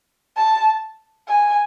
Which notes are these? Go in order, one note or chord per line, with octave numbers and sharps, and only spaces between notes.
A5
G#5